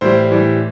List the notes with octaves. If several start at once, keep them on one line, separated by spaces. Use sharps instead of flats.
A2 E3 G3 C5
A2 E3 G3